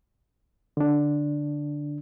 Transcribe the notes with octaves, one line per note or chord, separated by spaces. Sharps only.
D3 D4